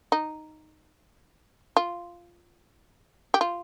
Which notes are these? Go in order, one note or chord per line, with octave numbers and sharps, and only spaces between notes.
D#4
F4
G4
F4